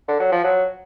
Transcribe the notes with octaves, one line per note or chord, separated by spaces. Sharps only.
D3
F#3
F3
F#3